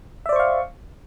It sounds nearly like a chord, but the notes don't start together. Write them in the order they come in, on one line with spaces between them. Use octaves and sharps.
E5 D5 C5 C#6 F5